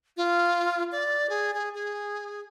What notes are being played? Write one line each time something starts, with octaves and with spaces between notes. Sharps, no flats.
F4
D5
G#4
G#4
G#4